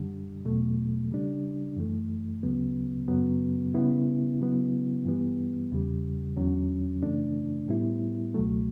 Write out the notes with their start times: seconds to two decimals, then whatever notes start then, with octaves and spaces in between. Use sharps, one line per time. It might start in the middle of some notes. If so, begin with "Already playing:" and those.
Already playing: F#2 D3 G3
0.45 E2 B2 F#3 A3
1.11 C#3 G3 D4
1.76 F#2 E3 A3
2.43 D2 C#3 F#3 B3
3.08 F#2 C#3 F#3 B3
3.74 C#3 G3 B3 E4
4.40 C#3 F#3 B3 E4
5.05 G2 E3 G3 B3
5.72 E2 C#3 G3
6.37 E2 D3 F#3 C#4
7.02 F#2 C#3 E3 A3 D4
7.68 A2 G3 B3 E4
8.34 C#2 B2 F#3 A3